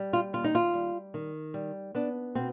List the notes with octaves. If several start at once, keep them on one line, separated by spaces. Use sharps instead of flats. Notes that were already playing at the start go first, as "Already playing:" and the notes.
Already playing: G3
F4
D#2 F4
D#4
F4
G3
D#3
G3
B3 D4
B2 C4